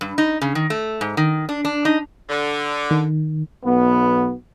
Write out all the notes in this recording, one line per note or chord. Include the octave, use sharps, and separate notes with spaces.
G2
D#4
C#3
D#3
A3
G#2
D#3
D4
D4
D#4
D3
D#3
B1 B3